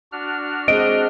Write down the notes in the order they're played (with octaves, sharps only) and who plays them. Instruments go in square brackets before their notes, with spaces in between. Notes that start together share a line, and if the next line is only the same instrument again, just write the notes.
[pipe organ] D4 F#4 F6
[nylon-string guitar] G#3 C4 [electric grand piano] D#5 [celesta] D7